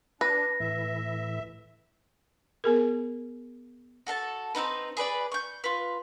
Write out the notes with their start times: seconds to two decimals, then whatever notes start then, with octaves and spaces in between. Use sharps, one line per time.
0.21 D4 B4 A#6
0.60 A2 E3 E5
2.64 B3 G#4 A#4
4.07 F#4 A4 F5 A5
4.55 C4 C#4 D#4 B4
4.97 G#4 B4 D5 B5
5.32 C#6 G6
5.64 F4 B4